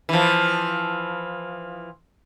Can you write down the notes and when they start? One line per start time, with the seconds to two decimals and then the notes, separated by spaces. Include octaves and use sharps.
0.09 E3 F3